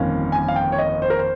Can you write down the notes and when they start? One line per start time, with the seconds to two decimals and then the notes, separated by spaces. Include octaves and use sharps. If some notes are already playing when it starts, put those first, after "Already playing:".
Already playing: G1 F2 D#3 A#3 C#4 F5
0.32 G#5
0.48 F5
0.56 G5
0.72 C#5
0.78 D#5
1.02 C5
1.10 A#4
1.19 C5